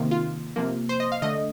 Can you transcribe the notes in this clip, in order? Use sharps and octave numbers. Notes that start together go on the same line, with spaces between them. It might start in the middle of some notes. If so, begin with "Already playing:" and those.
Already playing: C3 D#3 A#3
F4
C3 F3 A#3
C5
D#5
F5
D3 A3 D#5